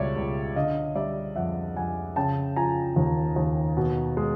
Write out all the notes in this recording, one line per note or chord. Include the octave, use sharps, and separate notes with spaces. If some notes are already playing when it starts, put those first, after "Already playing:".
Already playing: C#2 B2 G3 C#5 D5 E5
C#2
D3 D#5 F5
G3 D5 E5
F2 E5 F#5
F2 F#5 G#5
C#3 G5 A5
F3 G#5 A#5
D#2
D#2
B2
G#3